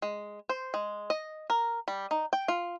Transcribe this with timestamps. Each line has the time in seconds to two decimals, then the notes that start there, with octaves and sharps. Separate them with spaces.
0.02 G#3
0.49 C5
0.74 G#3
1.10 D#5
1.50 A#4
1.88 G3
2.11 D#4
2.33 G5
2.48 F4